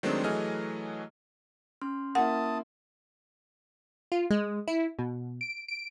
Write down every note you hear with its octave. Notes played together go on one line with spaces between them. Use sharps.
D#3 F#3 G#3 A3 C4 D4
E3 F#3 A3 G#4 D#5 F6
C#4 C6 F6
A#3 E4 F#5 A5 D#6
F4
G#3
E4
B2
D7
D7